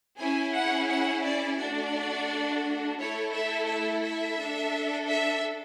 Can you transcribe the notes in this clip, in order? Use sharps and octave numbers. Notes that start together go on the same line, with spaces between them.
C#4 E4 G#4 G#5
F#5
F#5
D5
A3 D4 F#4 D5
A3 E4 A4 C#5
E5
E5
E5
D4 A4
E5